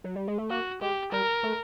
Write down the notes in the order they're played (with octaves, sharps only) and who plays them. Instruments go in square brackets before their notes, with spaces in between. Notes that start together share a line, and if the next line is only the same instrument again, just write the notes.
[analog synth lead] F#3
G3
G#3
A3
[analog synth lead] A#3 [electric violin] F#4
[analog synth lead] G#3 [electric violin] G4
[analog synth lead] G3 [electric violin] A#4
[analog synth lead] A3